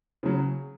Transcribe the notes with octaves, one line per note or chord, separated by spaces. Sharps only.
C#3 F#3